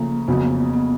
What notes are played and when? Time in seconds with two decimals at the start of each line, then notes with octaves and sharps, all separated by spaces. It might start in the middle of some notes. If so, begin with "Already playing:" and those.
Already playing: C#3 F3 A3 A#3
0.28 F2 C#3 F#3 B3
0.74 B3